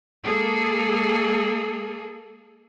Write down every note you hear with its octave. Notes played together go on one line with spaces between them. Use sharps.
G#3 A#3 G#4 A4